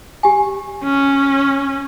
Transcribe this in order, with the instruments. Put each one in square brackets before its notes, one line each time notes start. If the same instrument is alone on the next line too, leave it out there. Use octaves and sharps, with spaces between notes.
[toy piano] G4 G#5
[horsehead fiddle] C#4